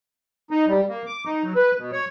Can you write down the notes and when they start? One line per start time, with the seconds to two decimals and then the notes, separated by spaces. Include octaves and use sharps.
0.51 D#4
0.68 G3
0.89 A#3
1.06 D6
1.25 D#4
1.44 F#3
1.55 B4
1.78 B2
1.92 C#5